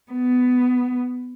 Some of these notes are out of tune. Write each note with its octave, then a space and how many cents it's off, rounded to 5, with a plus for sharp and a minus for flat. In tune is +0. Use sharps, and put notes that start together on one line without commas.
B3 +15